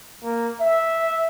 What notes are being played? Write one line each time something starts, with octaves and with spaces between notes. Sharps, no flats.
A#3
E5